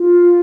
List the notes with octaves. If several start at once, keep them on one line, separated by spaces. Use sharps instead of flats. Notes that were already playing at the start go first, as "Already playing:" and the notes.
Already playing: F4